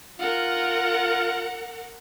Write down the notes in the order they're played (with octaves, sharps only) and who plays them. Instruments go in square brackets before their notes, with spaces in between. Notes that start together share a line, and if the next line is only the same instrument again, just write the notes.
[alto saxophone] F4 [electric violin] A#4 F#5